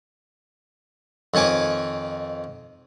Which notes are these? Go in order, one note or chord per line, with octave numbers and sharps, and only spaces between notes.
F2 D#3 C#5 G#5 D6